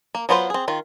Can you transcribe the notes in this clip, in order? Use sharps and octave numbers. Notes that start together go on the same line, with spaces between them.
A#3
F#3 B3 F4 B4 C5
C4 G#4
D#3 F4